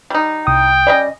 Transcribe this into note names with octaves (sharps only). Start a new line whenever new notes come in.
G3 D#4
C2 G5 D#6
G3 C#4 D5 D#5